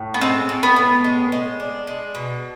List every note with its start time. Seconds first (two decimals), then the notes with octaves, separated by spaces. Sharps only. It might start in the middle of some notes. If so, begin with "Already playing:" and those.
Already playing: A2
0.14 B3
0.21 G#3 C4
0.49 A2
0.63 B3
0.76 A2
1.04 G#3
1.32 G#3
1.60 D4
1.87 G#3
2.15 B2